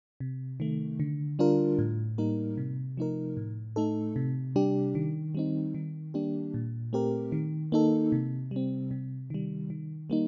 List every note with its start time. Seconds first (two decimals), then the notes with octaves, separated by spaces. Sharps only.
0.20 C3
0.60 D#3 A3
1.00 D3
1.39 G3 D4 F4 A#4
1.79 A2
2.18 G3 A#3 D#4 A#4
2.57 C3
2.97 F3 A3 D#4 A#4
3.37 A2
3.76 A3 D#4 A4
4.16 C3
4.56 G3 D4 G4
4.95 D#3
5.35 G3 C4 D#4
5.74 D#3
6.14 G3 A#3 D4 G4
6.54 A#2
6.93 A3 C4 G4 A#4
7.32 D#3
7.72 A#3 D#4 A4
8.12 C3
8.51 G3 C4
8.91 C3
9.30 D#3 G3
9.70 D#3
10.10 G3 A#3 D#4